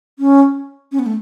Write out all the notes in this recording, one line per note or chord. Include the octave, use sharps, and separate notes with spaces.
C#4
C#4
B3
A3